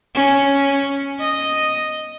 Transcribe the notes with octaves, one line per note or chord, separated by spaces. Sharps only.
C#4
D#5